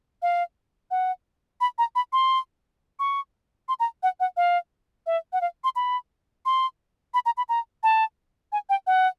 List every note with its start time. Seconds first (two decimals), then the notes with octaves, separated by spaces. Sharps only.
0.22 F5
0.91 F#5
1.61 B5
1.78 A#5
1.95 B5
2.13 C6
2.99 C#6
3.68 C6
3.80 A#5
4.03 F#5
4.20 F#5
4.37 F5
5.06 E5
5.33 F#5
5.41 F5
5.64 C6
5.76 B5
6.46 C6
7.14 B5
7.26 A#5
7.37 B5
7.49 A#5
7.83 A5
8.52 G#5
8.69 G5
8.87 F#5